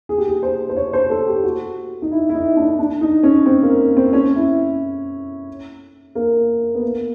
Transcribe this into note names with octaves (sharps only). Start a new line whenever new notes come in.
G#4
G4
G#4
C5
C5
C#5
C5
A4
G4
F#4
D#4
E4
E4
D#4
D4
D4
D#4
C#4
C4
A#3
C4
C#4
E4
A#3
B3
A#3